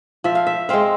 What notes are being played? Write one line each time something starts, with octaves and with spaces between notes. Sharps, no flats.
F3 E5
F5
E5
G#3 C4 F5